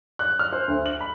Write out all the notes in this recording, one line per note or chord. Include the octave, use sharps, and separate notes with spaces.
F#6
F6
C5
D2
F#7
B5